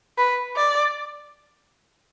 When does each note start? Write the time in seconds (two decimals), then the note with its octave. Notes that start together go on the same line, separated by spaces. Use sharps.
0.18 B4
0.56 D5